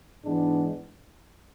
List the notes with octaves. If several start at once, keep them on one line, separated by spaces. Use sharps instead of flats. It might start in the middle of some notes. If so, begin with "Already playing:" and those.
G#2 E3 G#3 B3 D4